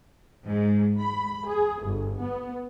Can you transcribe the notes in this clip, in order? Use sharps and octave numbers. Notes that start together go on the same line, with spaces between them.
G#2
B5
G#4
G1
B3